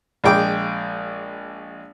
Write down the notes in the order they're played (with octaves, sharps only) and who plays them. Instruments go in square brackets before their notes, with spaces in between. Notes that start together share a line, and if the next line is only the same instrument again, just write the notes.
[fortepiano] A#1 G#3 G5 D6